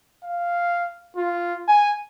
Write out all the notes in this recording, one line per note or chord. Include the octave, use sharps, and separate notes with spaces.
F5
F4
G#5